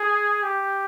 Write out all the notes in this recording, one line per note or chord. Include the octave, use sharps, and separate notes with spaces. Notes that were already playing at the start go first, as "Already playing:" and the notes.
Already playing: G#4
G4